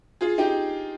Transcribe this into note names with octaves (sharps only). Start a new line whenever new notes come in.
F4 G#4
D#4 G4